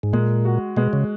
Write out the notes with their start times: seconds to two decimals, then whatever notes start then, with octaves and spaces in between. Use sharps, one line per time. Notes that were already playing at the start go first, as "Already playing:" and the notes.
0.03 G#2
0.13 A#2 G#3
0.45 F#4
0.77 B2 G#3
0.93 C#3